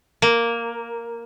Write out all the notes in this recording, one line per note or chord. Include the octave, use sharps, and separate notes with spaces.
A#3